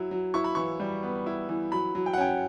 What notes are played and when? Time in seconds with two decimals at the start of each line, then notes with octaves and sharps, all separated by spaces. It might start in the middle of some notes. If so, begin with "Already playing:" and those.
Already playing: F#3 E4
0.11 F#3
0.34 E4 C#6
0.44 B5
0.55 E3 C#6
0.80 G3
1.03 B3
1.26 E4
1.49 E3
1.72 F#3 B5
1.95 F#3
2.06 G5
2.13 F#5
2.18 C#4 G5